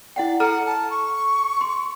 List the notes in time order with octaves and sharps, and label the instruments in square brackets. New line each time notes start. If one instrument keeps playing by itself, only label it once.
[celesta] E4 F#5 G5 [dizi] D5
[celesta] A4 A#5 F6 [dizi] F#5
[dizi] A5
C#6
[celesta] C6